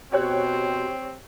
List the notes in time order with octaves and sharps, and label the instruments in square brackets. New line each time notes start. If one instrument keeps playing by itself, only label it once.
[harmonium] B2 C5 [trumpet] C4 [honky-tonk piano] G4 C#5 F#6